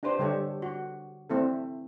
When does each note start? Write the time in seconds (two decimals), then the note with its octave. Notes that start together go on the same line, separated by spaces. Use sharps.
0.03 D4 G4 B4 C5
0.19 D3 G3 G4 A4 C#5
0.62 F#4
1.30 A3 C4 E4 A4